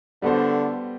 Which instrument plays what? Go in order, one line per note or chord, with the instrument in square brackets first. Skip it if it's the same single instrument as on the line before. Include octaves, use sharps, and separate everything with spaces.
[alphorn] D3 [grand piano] G3 B3 F#4 A4 C5